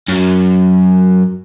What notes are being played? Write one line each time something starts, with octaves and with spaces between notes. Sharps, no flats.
F#2 F#3